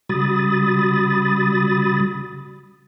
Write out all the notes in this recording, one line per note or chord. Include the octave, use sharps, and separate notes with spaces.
C#3 G3 F#4 B5 D#6 A6